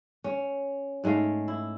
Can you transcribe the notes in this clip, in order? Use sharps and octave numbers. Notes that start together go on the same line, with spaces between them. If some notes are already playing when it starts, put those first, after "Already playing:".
C#4
G#2 G#3 A3 F5
E4